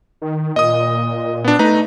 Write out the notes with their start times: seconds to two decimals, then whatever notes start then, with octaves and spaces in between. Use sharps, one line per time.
0.22 D#3
0.56 A#2 D#5 D#6
1.44 B3 D4
1.59 A3 D#4 B4 A#5